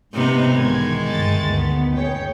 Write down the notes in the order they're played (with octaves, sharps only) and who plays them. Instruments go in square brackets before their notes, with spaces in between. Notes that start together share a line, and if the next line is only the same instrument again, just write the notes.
[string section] G#2 [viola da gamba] C3 B3 D#4
[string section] B1 E2 G#6 [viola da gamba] D#3 G#3
[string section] G1 A3 A6
D2 B3
G#4 C#5 G5